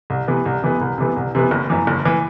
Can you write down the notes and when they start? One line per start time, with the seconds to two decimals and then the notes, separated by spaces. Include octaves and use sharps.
0.10 C2
0.28 C3 E3 B3
0.46 C2
0.63 C3 E3 B3
0.81 C2
0.98 C3 E3 B3
1.16 C2
1.35 C3 E3 B3
1.51 F#1
1.70 F#2 E3
1.87 F#1
2.06 E3